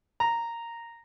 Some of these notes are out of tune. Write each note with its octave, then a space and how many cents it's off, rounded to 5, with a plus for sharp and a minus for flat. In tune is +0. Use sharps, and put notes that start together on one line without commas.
A#5 -5